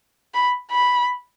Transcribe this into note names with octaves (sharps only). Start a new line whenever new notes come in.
B5
B5